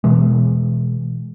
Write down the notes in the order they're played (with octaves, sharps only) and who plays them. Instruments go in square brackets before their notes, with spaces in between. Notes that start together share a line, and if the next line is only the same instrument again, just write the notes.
[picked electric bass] B2 E3 G#3